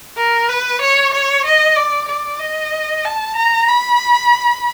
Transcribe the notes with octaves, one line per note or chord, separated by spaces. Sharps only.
A#4
B4
C#5
C#5
D#5
D5
D5
D#5
A5
A#5
B5